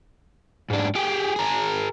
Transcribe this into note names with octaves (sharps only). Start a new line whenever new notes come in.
G#2 D4
G4 G#4
G#4 A#4